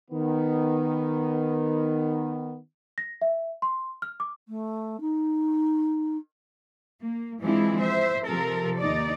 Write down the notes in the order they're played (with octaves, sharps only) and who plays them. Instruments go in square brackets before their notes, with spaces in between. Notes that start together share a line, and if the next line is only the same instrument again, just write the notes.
[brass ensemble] D#3 B3
[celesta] A#6
E5
C6
F6
D6
[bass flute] A3
D#4
[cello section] A#3
E3 F3 G#3 C4 D4 E4
C5 E5
C3 F3 A4 A#4
D#2 D#4 D5